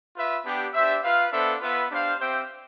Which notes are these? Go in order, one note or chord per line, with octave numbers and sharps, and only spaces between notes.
F4 B4 E5
B3 D4 G4
D4 G4 C5 E5
F4 B4 F5
B3 D4 A4 C5 E5
B3 F4 B4 E5
D4 G4 C5 F5
C4 G4 C5 E5 G5